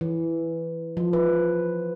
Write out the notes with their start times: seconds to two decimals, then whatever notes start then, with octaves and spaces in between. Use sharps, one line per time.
0.01 E3
0.97 F3
1.13 B4